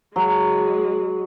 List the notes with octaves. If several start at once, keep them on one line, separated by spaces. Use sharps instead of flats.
F#3 G#3